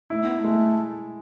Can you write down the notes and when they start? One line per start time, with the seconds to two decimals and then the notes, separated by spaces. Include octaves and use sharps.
0.10 A3 E4
0.22 B3
0.35 B3
0.39 A3
0.44 G#3